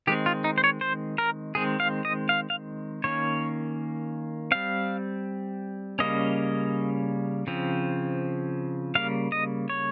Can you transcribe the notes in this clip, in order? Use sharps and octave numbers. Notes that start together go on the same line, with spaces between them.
D#3 G#3 C4 G4
F4
D#4
C5
C#5
C5
A#4
D#3 G#3 C4 G#4
F5
D#5
F5
F5
D#3 A#3 C#4 C#5
G3 C4 F5
C#3 G3 A#3 C#4 D#5
C#3 F3 C4
C#3 G3 A#3 F5
D#5
C#5